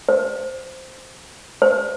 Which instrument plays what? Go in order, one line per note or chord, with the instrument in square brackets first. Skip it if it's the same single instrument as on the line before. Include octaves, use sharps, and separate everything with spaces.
[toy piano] C5
C5